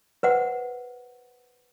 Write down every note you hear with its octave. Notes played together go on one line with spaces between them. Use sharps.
B4 C5 F#5